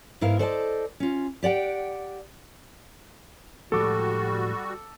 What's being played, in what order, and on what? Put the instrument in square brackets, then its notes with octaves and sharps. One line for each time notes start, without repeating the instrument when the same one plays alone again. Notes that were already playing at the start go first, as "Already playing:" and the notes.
[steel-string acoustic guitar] G#2 B3 E4 A#4 F5
A4 C5 D5 D#5 F5 A5
C#4 F4
G4 D5 F#5 G5
[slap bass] A2 F3 G#3 [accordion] G3 F#4 [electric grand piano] A4 D6